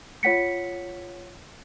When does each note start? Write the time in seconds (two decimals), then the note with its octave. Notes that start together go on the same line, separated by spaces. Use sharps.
0.23 F4 C#5 F#5 B6 C#7